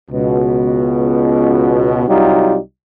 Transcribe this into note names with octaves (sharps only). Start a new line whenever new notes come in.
C#2 B2
C2 F#3 G3 D#4 F4 G4